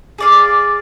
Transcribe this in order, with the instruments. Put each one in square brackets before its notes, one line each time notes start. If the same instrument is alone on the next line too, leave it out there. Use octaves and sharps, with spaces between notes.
[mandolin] G#4 D5 F5